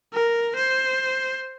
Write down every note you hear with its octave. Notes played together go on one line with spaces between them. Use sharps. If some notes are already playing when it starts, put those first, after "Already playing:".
A#4
C5